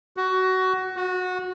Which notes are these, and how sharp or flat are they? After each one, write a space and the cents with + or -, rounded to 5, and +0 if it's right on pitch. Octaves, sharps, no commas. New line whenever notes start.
F#4 +15
F#4 -20